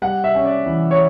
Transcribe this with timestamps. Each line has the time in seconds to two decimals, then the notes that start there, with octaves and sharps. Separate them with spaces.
0.02 G3 F#5
0.24 E5
0.35 C#4
0.45 D5
0.66 E3
0.91 C#5